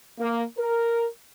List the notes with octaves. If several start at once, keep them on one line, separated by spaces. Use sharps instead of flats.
A#3
A#4